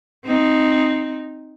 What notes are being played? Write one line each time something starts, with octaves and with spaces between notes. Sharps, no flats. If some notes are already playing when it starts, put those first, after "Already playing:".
C4 D#4